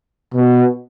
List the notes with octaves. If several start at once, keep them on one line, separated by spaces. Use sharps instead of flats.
B2